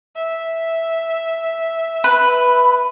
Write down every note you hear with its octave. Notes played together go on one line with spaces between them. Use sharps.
E5
B4 B5